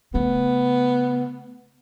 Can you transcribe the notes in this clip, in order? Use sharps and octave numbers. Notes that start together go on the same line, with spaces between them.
C#3 A3 B3